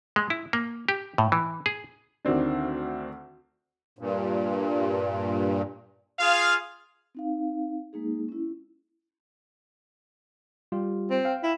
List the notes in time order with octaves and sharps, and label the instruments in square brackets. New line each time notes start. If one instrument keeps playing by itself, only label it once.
[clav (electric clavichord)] G#3
E4
A#3
G4
A2
E3
G#4
[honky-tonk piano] D2 D#3 C4 D4
[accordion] G2 A#2
[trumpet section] F4 G#4 F5
[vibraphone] C4 D#4 F5
G#3 A#3 D#4 G#4
C#4 E4
[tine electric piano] G3 F4 G4
[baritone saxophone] C4
[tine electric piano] F5 G5
[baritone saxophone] E4